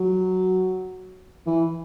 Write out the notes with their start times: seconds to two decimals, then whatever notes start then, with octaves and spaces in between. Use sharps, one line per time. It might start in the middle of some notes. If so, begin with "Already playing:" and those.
Already playing: F#3
1.47 E3